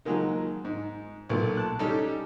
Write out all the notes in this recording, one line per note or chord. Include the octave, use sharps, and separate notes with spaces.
D#3 F3 F#3 G#3 A#3 D#4
G#2
B1 A#2 A3 A#3
A5 F#6
G3 C#4 D#4 G4 A4